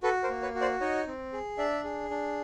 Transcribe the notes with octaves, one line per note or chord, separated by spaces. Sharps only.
F#4 A4 B4
A#4 C5
A#3
B4 C#5
F#4
C5 D5
D#4 C#5 D#5
C4
G#4
D4 D5 E5
G#4
D4